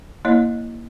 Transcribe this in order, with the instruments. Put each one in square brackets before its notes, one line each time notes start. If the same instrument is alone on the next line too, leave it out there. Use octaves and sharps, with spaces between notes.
[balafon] A#3 E4 C#5 D#5